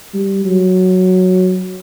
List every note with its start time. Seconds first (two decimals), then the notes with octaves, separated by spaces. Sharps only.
0.14 G3
0.45 F#3